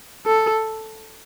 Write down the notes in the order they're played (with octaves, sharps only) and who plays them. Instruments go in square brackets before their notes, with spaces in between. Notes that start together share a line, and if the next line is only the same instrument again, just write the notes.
[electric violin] A4